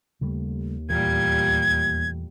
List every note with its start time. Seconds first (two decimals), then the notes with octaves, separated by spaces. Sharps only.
0.21 D#2 C#3 G3 A3
0.89 E2 A#2 E3 G3 A3 G#6